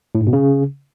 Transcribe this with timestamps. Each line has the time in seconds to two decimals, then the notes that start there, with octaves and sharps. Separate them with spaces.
0.15 A2
0.21 G#2
0.27 B2
0.33 C#3